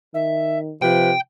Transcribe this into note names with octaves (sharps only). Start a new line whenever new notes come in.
D#3 E5
C3 F3 B4 G5